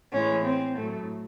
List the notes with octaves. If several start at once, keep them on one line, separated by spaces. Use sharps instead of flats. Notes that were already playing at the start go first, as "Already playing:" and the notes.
A2 E3 G#3 C#4
C4
A2 F#3 A3